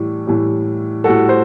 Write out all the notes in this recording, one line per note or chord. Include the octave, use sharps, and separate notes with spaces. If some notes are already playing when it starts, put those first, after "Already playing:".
Already playing: A2 E3 G3
A2 E3 G3
A2 G3 F#4 A4
C5